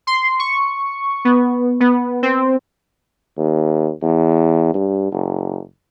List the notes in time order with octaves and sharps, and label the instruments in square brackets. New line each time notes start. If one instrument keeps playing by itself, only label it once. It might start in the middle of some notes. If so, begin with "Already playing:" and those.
[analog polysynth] C6
C#6
B3
B3
C4
[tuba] D#2
E2
G2
F#1